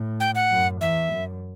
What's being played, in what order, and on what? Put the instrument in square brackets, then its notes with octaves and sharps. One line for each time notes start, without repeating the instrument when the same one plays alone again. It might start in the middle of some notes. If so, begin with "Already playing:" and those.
Already playing: [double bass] A2
[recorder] G5
F#5
[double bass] F#2
[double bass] E2 [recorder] E5
[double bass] F#2